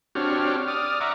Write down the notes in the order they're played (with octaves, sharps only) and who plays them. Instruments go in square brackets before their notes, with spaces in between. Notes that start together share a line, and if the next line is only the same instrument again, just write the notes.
[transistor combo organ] C4 D4 F#4 G4 C#5 F6
D5 D#6 F6
E5 F#5 A#5 C#6 D6